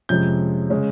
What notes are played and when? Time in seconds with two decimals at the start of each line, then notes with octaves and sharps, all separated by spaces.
0.09 F2 C3 F3 G#3 C#4 G6
0.70 C#3 G#3 C#4